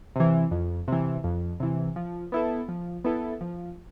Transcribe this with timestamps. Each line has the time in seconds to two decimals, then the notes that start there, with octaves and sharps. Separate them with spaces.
0.16 C3 E3
0.51 F2
0.88 C3 E3
1.24 F2
1.60 C3 E3
1.96 F3
2.32 B3 E4 A4
2.69 F3
3.04 B3 E4 A4
3.41 F3